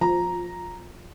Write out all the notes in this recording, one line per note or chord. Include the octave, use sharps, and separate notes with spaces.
F3 A#5